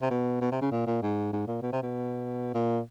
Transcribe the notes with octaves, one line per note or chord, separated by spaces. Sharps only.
C3
B2
B2
C3
C#3
A#2
A#2
G#2
G#2
A#2
B2
C3
B2
A#2